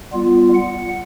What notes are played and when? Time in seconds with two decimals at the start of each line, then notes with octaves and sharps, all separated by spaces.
0.13 G3 B3 F4
0.54 F#5